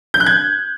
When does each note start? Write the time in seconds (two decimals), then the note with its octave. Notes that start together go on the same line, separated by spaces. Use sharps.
0.14 G6
0.20 F#6
0.26 G#6